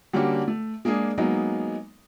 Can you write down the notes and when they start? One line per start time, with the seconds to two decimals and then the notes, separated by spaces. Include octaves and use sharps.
0.13 D3 G3 A#3 C#4 F#4 G4
0.48 A3
0.85 G#3 A#3 D4 G#4
1.18 F#3 G#3 A#3 B3 D#4